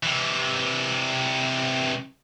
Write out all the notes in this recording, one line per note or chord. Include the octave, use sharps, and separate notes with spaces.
C3 E3